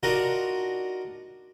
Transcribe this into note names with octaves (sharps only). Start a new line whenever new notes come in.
D4 D#4 F4 F#4 A#4